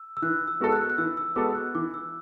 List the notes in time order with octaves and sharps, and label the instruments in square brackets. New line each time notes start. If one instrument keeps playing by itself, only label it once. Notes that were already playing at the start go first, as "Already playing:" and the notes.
Already playing: [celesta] E6
E6
[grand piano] E3 [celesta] F#6
[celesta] E6
[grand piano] G#3 B3 F#4 A4
[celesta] F#6
F#6
[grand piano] E3 [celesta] E6
[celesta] E6
[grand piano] G#3 B3 F#4 A4 [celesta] D6
[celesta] F#6
[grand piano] E3 [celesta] D6
[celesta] E6